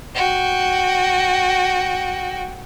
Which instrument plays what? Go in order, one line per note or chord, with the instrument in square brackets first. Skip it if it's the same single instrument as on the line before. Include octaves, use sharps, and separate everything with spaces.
[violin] F#4 G5